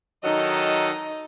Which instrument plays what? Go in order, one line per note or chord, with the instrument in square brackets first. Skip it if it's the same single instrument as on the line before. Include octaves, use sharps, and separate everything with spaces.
[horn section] D#3 F#3 A4 [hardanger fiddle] D#4 D#5